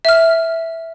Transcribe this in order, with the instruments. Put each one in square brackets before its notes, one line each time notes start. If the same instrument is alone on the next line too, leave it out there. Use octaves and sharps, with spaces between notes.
[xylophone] E5 F6